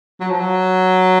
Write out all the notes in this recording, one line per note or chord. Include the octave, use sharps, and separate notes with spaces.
F#3
F3
F#3